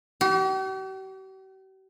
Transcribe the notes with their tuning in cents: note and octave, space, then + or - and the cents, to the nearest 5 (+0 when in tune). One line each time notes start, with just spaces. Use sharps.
G4 -45